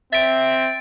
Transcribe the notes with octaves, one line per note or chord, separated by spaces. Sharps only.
C4 E5 A6 D7